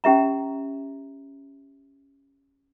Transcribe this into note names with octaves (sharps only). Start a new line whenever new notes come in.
C#4 G4 E5 A#5